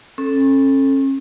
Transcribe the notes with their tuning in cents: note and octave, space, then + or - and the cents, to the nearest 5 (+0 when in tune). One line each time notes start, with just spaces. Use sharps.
C#4 -40 A4 +0